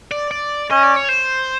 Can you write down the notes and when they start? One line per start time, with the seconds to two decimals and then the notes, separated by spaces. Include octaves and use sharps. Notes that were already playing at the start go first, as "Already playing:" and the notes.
0.11 D5
0.31 D5
0.70 C#4 D#5
0.83 D5
0.96 C#5
1.09 C5